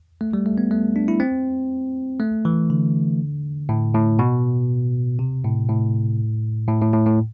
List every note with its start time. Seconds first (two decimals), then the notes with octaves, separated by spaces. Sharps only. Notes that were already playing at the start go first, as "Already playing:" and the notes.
0.21 A3
0.33 G3
0.46 A3
0.58 B3
0.71 A3
0.96 D4
1.08 E4
1.20 C4
2.20 A3
2.45 E3
2.70 D3
3.69 A2
3.95 A2
4.19 B2
5.19 C3
5.44 A2
5.69 A2
6.68 A2
6.81 A2
6.93 A2
7.06 A2